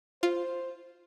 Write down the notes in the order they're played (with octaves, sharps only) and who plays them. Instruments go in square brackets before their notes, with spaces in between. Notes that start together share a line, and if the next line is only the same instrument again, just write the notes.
[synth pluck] F4 [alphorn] C5